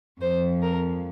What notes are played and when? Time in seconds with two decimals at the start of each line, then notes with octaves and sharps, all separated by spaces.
0.20 F2 F3 C5
0.62 A#4